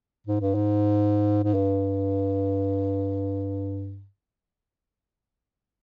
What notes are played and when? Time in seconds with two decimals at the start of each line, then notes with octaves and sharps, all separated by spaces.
0.27 G#2
0.40 G2
0.55 G#2
1.43 G#2
1.54 G2